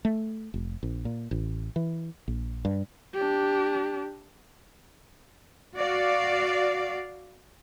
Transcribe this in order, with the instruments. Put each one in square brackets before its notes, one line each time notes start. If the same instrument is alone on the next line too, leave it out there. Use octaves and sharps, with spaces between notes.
[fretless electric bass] A3
F1
A#1
A#2
A1
E3
A#1
G2
[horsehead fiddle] D4 G4
[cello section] F#4 D5 F5